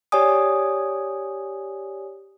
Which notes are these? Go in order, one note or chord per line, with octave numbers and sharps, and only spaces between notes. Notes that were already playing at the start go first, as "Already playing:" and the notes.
G4 C#5 D5 G#5 D#6